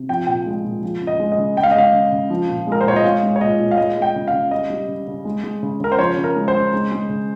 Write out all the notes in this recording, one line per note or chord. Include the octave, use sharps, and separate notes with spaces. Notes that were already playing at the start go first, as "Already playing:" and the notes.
Already playing: C3
F3 G5
A#2 G5
G#3
A#2
F3
C#3
D#5
G#3
D#5
C#3
G#3 G5
F5
D#5
G#3 F5
C#3
C#3
F3
A#2
G#3 A#4
C5
A#2 C#5
D#5
G#3 F5
G#3
C#5
A#2 D#5
A#2
F5
G#3 D#5
G#3
G5
C#3
F5
C#3
G3 D#5
G3
C#3
C#3
G#3
G#3
C#3
C#3 A#4
C5
F3 C#5
C#3
A#4
G#3
C5
C#3
G#3
G#3
C#3